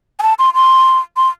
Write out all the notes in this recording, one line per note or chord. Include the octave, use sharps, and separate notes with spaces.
G#5
A5
C6
C6
C6